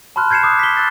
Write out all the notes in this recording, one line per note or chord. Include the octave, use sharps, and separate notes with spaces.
A5 B5 C6 F6 F#6
G6 G#6 C7 C#7 E7
D6 D#6 F#6
B6 G7
E6 F#6 A6 C7